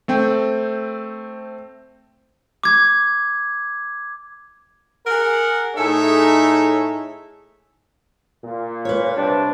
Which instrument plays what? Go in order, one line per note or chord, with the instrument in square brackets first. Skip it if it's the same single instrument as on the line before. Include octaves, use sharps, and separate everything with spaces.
[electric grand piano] A3 C4 G5
[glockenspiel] D6 G#6
[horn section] G#4 A#4 F#5
A2 D#4 G#4 A4 C#5 E5
[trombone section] A#2
[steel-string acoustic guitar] B4 C#5
[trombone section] C3 G3 D4